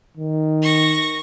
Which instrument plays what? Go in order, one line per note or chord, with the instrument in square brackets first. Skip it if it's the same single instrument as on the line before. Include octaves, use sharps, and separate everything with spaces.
[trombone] D#3
[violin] C#6 A#6